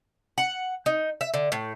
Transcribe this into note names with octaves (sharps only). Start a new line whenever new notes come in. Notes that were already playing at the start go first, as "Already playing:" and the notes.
F#5
D#4
E5
D3
A2